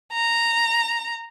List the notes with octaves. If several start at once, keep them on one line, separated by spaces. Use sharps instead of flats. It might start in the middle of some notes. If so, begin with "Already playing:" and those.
A#5